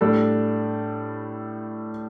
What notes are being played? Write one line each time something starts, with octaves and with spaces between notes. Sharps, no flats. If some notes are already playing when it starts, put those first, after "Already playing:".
A2 G3 D4 A4